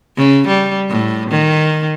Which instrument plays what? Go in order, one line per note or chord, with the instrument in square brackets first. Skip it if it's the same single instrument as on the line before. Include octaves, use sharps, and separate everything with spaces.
[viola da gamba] C#3
G3
A2
D#3